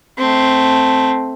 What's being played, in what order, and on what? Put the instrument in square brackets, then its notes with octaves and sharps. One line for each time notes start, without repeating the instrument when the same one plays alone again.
[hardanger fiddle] A3 C4